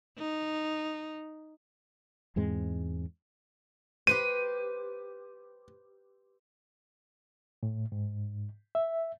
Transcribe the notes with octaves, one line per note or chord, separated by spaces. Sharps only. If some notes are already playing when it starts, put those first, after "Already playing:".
D#4
E2 G#2 G#3 C4
G4 B4 C5 D#7
A2
G#2
E5